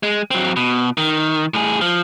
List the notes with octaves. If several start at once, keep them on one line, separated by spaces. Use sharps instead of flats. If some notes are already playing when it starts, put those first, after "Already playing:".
G#3
F#3 C4
B2
D#3
A2 G#4
F3